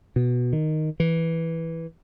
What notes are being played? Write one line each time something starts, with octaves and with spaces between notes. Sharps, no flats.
B2
D#3
E3